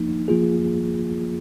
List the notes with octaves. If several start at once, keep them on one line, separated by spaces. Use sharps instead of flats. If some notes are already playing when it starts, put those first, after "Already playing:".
Already playing: F3 A#3 D#4
F3 A#3 F4 G#4